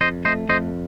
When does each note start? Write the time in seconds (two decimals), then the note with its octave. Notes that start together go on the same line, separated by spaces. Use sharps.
0.01 F2 C5 D#5
0.25 A3 C5 D#5
0.49 F2 C5 D#5